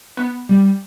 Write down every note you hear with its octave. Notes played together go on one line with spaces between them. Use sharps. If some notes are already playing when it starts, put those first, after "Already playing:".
B3
G3